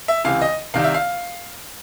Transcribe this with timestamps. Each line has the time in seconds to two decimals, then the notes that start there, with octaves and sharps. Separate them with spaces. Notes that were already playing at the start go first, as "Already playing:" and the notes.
0.08 E5
0.24 C#2 C3 E3 F5
0.41 D#5
0.74 C2 C3 D#3 F5
0.84 E5
0.94 F5